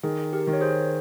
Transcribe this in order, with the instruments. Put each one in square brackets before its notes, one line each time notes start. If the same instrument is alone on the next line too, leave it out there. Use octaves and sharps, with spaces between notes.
[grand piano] D#3 [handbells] G#4
[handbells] G4 A#4
[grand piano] D#3
[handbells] C#5
G#4 C5